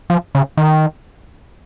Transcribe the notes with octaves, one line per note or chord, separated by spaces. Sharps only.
F3
C#3
D#3